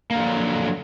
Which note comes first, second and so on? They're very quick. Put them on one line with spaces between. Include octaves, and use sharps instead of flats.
A#3 D3 F3 F#3